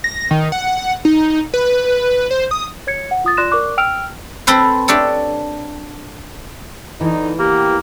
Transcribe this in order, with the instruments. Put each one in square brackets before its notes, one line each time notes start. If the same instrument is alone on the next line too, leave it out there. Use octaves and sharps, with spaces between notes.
[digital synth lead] A#6
D#3
F#5
D#4
B4
C5
D#6
[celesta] C#5 G#6 C#7
F#5
F4 D#6 A6
F4 D5 C6 F#6 A#6 E7
A#4 D5 C#6 D6 F#6
G5 E6 F6 D7 F7
[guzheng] C4 A4 B4 C5
D4 G4 A4 C#5
[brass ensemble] D3 D#4 [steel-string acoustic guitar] E3
[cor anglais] A#3 [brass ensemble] B3 G4